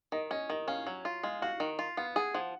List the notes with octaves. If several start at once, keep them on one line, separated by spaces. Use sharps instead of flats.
D#3 D#5
C#4 D#5
D#3 D#5
C#4 F5
F#3
F4
G#3 F5
F#4 F5
D#3
F4
B3 F5
G#4 F#5
F3 F#5